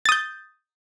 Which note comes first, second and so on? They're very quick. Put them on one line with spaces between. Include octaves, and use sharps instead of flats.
A6 D#6 G6